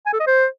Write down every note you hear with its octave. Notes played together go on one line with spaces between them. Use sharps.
G#5
A4
D#5
C5